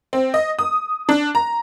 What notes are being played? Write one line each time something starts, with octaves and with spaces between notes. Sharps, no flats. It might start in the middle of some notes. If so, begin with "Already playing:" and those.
C4
D#5
D#6
D4
A#5